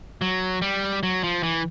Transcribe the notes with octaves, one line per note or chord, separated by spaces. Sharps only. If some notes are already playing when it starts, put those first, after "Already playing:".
F#3
G3
F#3
F3
E3